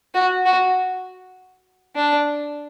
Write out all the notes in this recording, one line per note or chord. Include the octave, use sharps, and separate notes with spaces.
F#4
F#4
D4